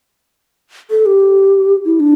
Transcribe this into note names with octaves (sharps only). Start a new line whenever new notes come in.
A4
G4
E4
D4